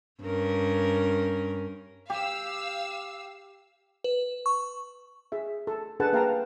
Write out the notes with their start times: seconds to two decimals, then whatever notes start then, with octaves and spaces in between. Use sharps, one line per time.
0.22 G2 C#4 A#4
2.10 G4 F5 E6
4.04 B4
4.46 C#6
5.32 G#4 E5
5.67 A4
6.00 D4 G#4 A4 B4 F#5 A5
6.13 A#3 B4 F5 G5 A5 A#5